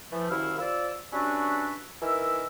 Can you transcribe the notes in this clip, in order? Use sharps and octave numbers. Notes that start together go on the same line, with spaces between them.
E3 F3 A3
C2 F#2 D#3 E4 F5 E6
C4 F4 D5 E6
G3 C#4 D4 F#4 B4 E5
D#3 E3 A#4 E5 E6